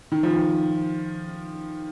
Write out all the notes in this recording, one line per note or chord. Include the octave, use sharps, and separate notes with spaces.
D#3
F3
D#3